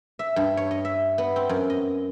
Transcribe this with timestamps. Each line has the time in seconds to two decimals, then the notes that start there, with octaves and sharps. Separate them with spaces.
0.19 E5
0.36 G2
0.57 C#5
0.71 D#5
0.85 E5
1.18 B3
1.36 C4
1.49 F#2
1.70 D#5